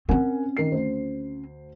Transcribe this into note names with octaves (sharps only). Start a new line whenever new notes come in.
C4 C#4 A#4 F#5 G#5
D#3 A#4 C7
D2 C5